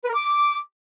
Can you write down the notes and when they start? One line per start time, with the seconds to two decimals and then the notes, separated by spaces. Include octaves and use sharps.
0.04 B4
0.09 A#4
0.14 D6